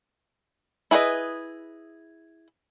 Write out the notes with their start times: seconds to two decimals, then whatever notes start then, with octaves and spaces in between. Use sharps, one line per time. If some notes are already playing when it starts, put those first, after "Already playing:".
0.91 E4 G#4 B4 C5 D#5